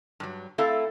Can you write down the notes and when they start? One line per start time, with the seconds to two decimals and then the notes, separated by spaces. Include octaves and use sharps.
0.20 G2 F#3
0.58 A3 C4 E4 A4 F5